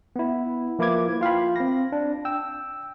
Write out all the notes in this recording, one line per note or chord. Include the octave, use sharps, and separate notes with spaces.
B3 E4
F3 A#3 E4 B4 D6 G#6
F4 F5 G5 B5
C4 A#6
D4
G5 E6